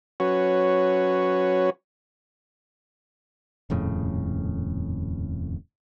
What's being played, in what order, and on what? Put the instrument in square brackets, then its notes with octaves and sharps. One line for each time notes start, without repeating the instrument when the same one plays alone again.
[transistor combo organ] F#3 C#4 F#4 B4 C#5
[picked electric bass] D#1 F2 A2 C#3